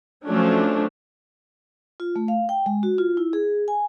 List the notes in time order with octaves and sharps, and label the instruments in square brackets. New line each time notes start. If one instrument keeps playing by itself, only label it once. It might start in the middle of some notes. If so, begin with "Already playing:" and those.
[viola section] F3 F#3 A3 C#4 D4
[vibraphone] F4
A3
F5
G5
G#3
F#4
F4
E4
G#4
G#5